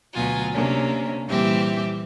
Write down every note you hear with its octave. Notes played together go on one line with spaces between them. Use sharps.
D2 B2 F#3 F4 G#5
C3 A#3 C#4 D4
A#2 E3 G3 C4 G4 E5